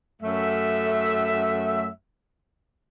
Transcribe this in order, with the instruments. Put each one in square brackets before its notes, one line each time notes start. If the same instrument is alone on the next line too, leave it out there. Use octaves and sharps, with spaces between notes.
[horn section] F#2 A3 E5